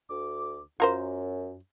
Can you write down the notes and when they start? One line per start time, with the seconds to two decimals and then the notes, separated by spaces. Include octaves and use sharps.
0.09 D2 D6
0.80 F#2 F4 A#4 C5